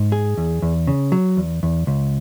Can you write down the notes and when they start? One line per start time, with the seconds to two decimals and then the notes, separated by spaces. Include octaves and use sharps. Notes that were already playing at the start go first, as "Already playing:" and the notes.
Already playing: G#2
0.12 G#4
0.37 E2
0.62 E2
0.87 C#3
1.12 F#3
1.37 E2
1.63 E2
1.87 C#2